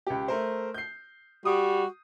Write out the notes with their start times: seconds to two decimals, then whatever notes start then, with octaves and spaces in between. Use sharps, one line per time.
0.07 C#2 G4
0.28 A3 A#4 C5
0.74 G6 C7
1.45 G3 F#4 D#6